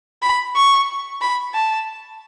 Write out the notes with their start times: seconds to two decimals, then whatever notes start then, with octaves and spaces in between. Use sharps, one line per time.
0.23 B5
0.56 C#6
1.21 B5
1.54 A5